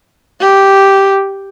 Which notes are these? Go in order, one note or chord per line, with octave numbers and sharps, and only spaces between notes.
G4